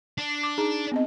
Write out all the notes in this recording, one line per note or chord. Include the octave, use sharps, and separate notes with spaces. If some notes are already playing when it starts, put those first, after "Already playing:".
D4
D6
D#4 G#4 A#5
B3 C4 D#5